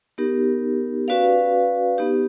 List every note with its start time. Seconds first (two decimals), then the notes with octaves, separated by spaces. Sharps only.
0.18 B3 D#4 G4 A#4
1.08 C#4 F#4 B4 D5 F5
1.98 B3 D#4 G4